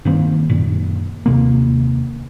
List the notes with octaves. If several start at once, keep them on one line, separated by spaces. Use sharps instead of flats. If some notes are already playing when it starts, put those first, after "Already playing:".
G2 D#3 A#3 C4
F#2 A#2
D#2 C3 A#3